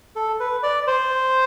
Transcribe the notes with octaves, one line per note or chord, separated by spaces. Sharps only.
A4
B4
D5
C5